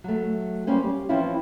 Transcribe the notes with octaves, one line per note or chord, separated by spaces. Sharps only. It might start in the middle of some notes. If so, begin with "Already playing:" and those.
F#3 A3
G3 A#3 C#4 C5
G4
E3 F3 C4 C#4 E4 F4